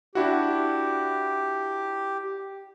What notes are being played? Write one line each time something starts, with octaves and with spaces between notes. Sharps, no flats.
D4 E4 F#4 G4